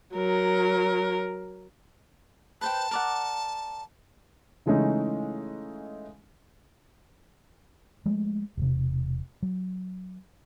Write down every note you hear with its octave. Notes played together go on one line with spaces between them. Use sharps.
F#3 A#4
B4 C5 G5 A5
A#4 D5 F#5
C#3 E3 G#3 A3 C#4 D#4
F3 G#3 A3
E1 C3
F#3